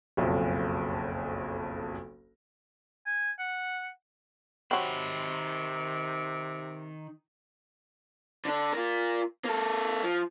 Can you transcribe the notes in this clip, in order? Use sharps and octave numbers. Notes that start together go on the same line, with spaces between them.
F#1 B1 F2
G#5
F#5
C3 D#3 F#3 C4 B5
D3 D4
F4 A#4
A#3 A4
F3